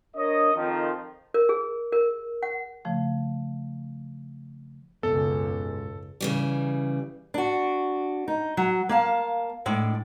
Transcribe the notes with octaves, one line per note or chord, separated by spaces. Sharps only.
D4 A#4 C#5 D#5
F2 D#3 F3
A#4
G#4
A#4
F#5
C#3 F3 A3
F#1 C#2 G#2 B2 B3 A4
C#3 E3 G3
D4 F#4
D#4
F#3
A#3 F5 A5
A2 G#3 D4